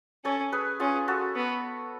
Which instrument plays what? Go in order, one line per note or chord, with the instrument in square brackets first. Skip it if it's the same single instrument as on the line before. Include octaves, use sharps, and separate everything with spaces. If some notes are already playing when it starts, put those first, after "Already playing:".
[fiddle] C#4 [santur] A4 C#5
[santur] G#4 B4
[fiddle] C#4 [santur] F4 G#4
[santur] F#4 A4
[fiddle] B3